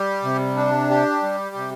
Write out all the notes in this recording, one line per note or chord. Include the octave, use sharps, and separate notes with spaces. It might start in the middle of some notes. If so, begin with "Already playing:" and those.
Already playing: G3 G4
C3
D4
G4
G3
C3